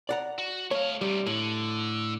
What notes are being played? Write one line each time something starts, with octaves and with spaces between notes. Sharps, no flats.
D5 F#5 A#5
F#4
A3 C#5 F5
D2 C3 G3
A2 D3